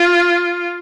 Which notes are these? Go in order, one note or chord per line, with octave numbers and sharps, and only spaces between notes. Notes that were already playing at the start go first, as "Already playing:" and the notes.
Already playing: F4